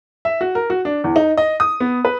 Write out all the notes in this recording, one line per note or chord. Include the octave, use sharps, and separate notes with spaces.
E5
F#4
A#4
F#4
D4
E2
D#4
D#5
D#6
B3
B4